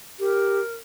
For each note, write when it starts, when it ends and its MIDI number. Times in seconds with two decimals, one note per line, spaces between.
0.20 0.61 67
0.20 0.74 70